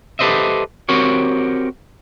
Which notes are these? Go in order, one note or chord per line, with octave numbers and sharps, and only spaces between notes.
G4 A4 B4 C5 D#5 E5
C4 F#4 G4 A#4 C#5